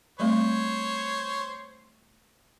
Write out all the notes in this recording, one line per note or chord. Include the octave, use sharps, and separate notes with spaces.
G3 A3 C4 C5 C#5